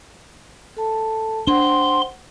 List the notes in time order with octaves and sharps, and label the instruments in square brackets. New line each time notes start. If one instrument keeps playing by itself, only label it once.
[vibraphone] A4 A5
[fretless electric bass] D4 [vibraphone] C5 F#5 G5 [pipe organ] C6